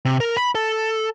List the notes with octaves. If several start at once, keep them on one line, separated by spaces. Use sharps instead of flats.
C3
A#4
B5
A4